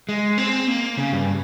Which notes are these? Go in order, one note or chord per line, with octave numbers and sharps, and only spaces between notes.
G#3
C4
A#3
C#3
G2